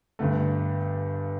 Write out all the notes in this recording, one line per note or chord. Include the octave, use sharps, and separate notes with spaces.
G1 G2 D3 A3